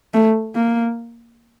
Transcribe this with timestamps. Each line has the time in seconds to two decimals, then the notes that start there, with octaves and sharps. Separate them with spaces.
0.14 A3
0.55 A#3